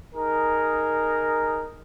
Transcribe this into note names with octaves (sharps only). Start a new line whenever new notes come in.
D#4 G#4 A#4